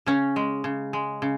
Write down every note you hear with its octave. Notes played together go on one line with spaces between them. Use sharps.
C#3 C#4
G#3
C#3
G#3
C#3